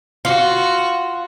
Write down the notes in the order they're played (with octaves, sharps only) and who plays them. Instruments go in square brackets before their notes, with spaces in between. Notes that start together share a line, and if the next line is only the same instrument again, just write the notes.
[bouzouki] F4 [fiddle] F#4